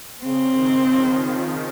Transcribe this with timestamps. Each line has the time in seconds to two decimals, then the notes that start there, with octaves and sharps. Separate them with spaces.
0.24 C#3 C4
0.56 D#3
0.88 F3